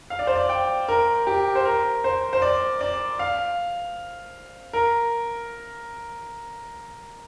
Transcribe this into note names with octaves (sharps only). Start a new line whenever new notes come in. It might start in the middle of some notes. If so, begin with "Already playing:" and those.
F5
D5
C5
D5
G5
A#4
G4
C5
A#4
C5
C5
D5
D5
F5
A#4